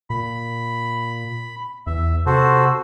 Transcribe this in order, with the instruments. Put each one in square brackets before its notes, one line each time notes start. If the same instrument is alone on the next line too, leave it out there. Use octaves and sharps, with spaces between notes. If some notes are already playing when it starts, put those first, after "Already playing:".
[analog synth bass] A#2 [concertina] B5
[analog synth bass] E2 [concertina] E5
[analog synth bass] C3 [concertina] F#4 A4 C5